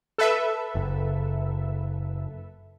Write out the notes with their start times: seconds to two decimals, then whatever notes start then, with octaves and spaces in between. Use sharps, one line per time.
0.18 A4 B4 E5
0.75 F#1